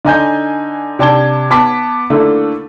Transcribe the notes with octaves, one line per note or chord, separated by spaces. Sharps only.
D3 D#4 G#5 G6
C3 D4 A5 G#6 G7
B3 A5 D6 B6
D3 A3 A#3 E4 A4